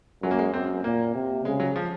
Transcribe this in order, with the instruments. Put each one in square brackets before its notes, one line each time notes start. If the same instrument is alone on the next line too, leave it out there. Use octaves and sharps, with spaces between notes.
[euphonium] F#2 [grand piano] F#3
[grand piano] A#3
G#3
[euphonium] F#2 [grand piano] C4
[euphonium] A#2 [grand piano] A#3
[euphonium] C3
[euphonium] C#3 [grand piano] G#3
[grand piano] F#3
F3